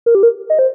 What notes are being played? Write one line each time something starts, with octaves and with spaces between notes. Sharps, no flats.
A#4
G4
A#4
D#5
C5